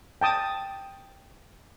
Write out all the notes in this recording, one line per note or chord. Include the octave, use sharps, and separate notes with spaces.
G5 A5 D#6